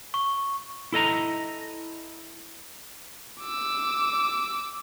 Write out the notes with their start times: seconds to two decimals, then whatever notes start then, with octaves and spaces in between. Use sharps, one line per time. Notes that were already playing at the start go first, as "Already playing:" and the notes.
0.14 C#6
0.92 E4 A4 D#5 A#5
3.42 D6 E6